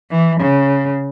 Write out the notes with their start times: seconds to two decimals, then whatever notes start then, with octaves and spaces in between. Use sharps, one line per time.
0.11 E3
0.40 C#3